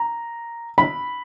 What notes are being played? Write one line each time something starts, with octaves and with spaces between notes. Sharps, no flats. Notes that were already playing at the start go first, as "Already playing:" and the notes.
Already playing: A#5
B5